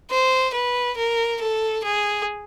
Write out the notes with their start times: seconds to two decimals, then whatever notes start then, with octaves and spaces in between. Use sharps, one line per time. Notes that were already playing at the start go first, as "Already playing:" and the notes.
0.11 C5
0.54 B4
0.97 A#4
1.41 A4
1.84 G#4